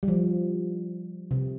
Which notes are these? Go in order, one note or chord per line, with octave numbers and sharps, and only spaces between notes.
G3
F3
C3